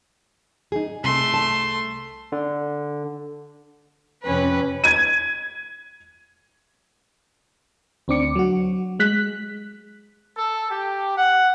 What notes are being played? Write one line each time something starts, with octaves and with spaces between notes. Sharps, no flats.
D#4 G#4
C2 A3 C6
A5
D3
F2 C3 C#4 B4
G#6 D#7
D2 C4 D4 D6 C#7
F#3 F#4
G#3 F#6 B6
A4
G4
F#5